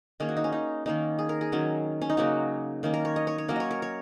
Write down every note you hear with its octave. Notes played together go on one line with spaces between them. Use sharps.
D#3 A#3 C#4 G#4
F#4
D#4
C#4
D#4
D#3 A#3 C#4 D#4
G#4
A#4
G#4
D#3 F#3 C#4
C#4
D#4
C#3 F#3 A#3 C#4 F#4
D#3 A#3 C#4
A#4
C#5
D#5
C#5
C#5
F#3 A#3 C#4 A#4
C#5 D#5
A#4
C#5